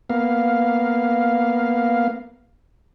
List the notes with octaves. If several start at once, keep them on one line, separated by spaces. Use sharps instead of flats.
A#3 B3 F5